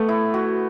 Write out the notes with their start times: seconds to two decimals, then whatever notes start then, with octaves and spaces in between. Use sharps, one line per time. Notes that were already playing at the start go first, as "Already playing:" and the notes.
Already playing: A3 B3
0.09 E4
0.34 F#4